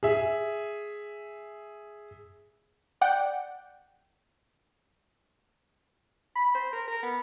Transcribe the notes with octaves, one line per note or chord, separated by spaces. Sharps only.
G#4 E5
D5 F#5 G5
B5
C5
A#4
A#4
B3